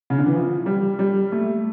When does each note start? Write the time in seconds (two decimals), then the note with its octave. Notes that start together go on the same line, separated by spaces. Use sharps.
0.10 C#3
0.18 D3
0.26 E3
0.34 F3
0.66 G3
0.99 G3
1.32 A3